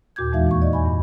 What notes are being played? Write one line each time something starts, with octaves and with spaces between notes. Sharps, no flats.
D#2 A#2 F#4 D6 G6 G#6
E2 E3 G#3 D#4 E5 F5
E3 A#3 C#6
D5 D#5
G#5 B5
E2 G2